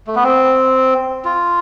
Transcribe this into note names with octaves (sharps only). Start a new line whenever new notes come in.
A3
B3
C4
F4